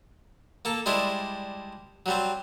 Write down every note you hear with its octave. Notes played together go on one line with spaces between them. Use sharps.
A#3 A4
G3 G#3 D4 E4 C5
F#3 G3 C4